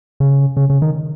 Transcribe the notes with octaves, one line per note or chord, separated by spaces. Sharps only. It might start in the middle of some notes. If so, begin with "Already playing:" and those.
C#3
C#3
C#3
D#3